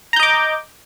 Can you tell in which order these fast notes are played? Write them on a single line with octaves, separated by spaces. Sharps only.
A#5 G6 D#5 D6